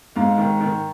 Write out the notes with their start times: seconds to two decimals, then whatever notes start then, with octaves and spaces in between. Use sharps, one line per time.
0.16 G#2 F5
0.38 D#3
0.60 D#3